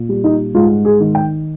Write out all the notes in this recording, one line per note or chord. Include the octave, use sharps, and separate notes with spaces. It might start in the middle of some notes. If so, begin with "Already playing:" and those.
Already playing: A#2
G3
D#4
G#2 F4
G#4
D#3
G5